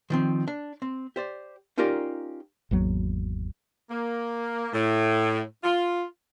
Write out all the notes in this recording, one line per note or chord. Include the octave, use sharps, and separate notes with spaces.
D#3 F3 C4
D4
C4
G4 C5 D5
C#4 D#4 F4 G4 A#4 D5
G#1 E2 F#3 A#3
A#3
A2
F4